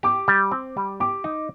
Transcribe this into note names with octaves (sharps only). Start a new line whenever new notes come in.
G4 D6
G3
C4
G3
G4 D6
D#4